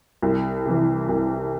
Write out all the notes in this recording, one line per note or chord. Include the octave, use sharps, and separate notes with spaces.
C2
C3 E3
C2